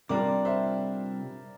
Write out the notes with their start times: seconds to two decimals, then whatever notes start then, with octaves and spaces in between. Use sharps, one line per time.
0.09 C3 G3 D4 F4 A#4 D5
0.45 C5 E5